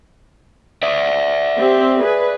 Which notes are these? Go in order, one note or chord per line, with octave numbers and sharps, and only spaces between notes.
D5 E5
C4 G4
G#4 B4